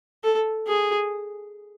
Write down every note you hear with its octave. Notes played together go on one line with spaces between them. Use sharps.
A4
G#4